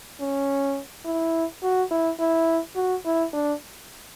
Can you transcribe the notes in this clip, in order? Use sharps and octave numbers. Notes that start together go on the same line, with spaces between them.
C#4
E4
F#4
E4
E4
F#4
E4
D4